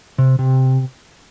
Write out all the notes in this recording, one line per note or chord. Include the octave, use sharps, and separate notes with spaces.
C3
C3